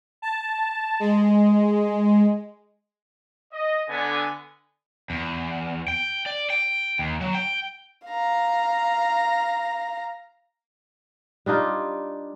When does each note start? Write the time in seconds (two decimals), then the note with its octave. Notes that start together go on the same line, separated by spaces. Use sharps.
0.22 A5
1.00 G#3
3.53 D#5
3.89 D3 B3 G#5
5.10 E2
5.88 G5
6.26 D5
6.50 G5
6.99 D#2
7.21 F#3
7.35 G5
8.06 F5 A#5
11.46 G3 D4 D#4 F4